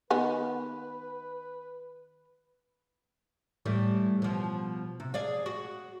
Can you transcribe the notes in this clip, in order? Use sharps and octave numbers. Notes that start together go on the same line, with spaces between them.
D#3 B3 B4 G#5
A2 E3 G3
B2 F3
C3
G#4 D5 F5
F#4